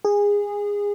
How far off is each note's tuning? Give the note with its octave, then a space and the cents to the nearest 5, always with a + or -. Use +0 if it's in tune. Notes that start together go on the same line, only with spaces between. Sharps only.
G#4 -20